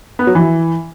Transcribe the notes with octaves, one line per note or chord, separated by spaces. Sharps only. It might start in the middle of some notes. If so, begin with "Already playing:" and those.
B3
F#3
E3